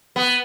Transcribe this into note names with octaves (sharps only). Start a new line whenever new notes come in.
B3